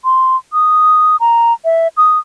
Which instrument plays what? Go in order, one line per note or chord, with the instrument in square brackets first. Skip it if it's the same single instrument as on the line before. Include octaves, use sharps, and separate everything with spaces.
[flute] C6
D#6
A#5
E5
D#6